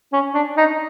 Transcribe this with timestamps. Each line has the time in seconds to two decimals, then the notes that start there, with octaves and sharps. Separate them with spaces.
0.13 C#4
0.34 D4
0.57 D#4